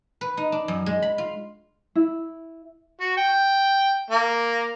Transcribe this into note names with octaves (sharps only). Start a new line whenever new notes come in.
B4
D#4
D4
F#2
G#3
B5
F4
E4
F#4
G5
A#3